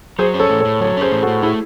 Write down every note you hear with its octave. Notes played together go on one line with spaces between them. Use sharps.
F#3 G#4 C5
C#4
A4 C#5
A2
A4 C#5
A2
F#3 A4 C#5
C#4 G#4 C5
A2
F#4 A4
A2
A3 E4 G#4